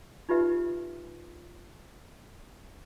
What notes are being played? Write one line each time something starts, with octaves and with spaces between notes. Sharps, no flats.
D#4 F4 G4 B4 E5